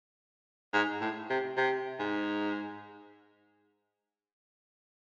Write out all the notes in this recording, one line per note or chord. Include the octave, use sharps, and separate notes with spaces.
G#2
A2
C3
C3
G#2